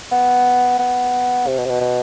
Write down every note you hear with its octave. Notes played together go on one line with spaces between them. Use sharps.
B3
B3
C3
B2
C3
B2
B2